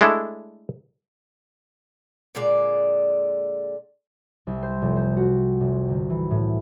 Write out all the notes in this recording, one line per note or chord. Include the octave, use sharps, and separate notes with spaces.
G#3 A3 D4 E4 A4
A#2 D3 G#3 D5
C2
C5
F1
C5
F#4
F1
G1
E3
A2